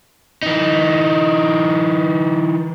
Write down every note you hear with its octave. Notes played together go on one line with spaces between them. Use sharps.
E3 D#4